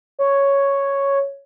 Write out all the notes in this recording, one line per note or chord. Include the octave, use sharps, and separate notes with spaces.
C#5